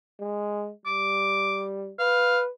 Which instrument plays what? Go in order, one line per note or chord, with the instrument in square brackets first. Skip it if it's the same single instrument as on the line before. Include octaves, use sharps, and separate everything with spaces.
[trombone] G#3
[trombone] G3 [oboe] D6
[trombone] B4 [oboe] F5